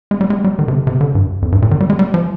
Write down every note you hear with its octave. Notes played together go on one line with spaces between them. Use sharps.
G#3
G3
G#3
G3
D#3
C3
D3
C3
D3
G2
F2
G2
A#2
D#3
G3
G#3
G3
F3